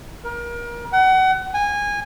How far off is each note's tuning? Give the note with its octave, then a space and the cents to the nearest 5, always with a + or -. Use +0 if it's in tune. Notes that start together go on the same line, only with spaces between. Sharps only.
A#4 +30
F#5 +30
G#5 -20